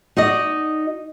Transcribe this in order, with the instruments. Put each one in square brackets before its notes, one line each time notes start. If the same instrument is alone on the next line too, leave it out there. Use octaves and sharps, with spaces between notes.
[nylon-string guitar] D#4 F#4 D5 D#5